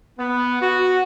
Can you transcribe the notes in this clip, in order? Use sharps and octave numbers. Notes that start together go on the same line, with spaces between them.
B3
F#4